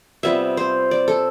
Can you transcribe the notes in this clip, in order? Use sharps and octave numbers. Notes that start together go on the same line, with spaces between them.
C3 G3 B3 F4 E5
C5
D5
A4